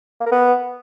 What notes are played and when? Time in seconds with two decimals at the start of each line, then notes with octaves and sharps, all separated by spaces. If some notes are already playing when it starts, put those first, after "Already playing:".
0.21 A#3
0.26 A#4
0.32 B3